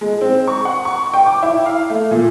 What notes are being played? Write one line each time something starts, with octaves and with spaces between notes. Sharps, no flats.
G#3
C4
C#6
F#5
C#6
G5
D6
E4
F5
A3
A#2